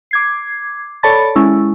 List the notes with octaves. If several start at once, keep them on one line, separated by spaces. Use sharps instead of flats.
D6 G#6 C7
A4 C#5 D5 A5 B5 A6
G#3 C#4 E4